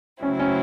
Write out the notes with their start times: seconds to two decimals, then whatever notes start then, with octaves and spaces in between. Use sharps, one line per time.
0.22 C#3 F#3 A3 C4 C#4 E4
0.39 C#4